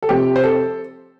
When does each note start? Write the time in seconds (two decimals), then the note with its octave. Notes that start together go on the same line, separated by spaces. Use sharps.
0.02 A4
0.09 F1 F2 C3 G4
0.36 C5
0.44 A4